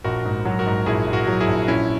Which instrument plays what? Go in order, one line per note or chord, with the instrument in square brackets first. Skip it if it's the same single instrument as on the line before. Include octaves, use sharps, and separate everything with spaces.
[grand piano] A#1 [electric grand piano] F#4 A#4
[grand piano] G#2
F#3
[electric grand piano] F#4 A#4
[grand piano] G#2
[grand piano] A#1 [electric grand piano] E4 G#4
[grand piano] A#1
[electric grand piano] F#4 A#4
[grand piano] F#3
[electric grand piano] E4 G#4
[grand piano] A#1
[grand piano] A#1 [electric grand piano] C#4 E4